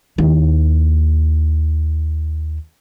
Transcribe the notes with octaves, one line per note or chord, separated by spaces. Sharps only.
D#2 E4